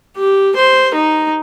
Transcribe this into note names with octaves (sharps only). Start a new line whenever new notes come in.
G4
C5
D#4